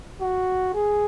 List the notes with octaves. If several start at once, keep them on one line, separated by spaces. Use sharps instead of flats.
F#4
G#4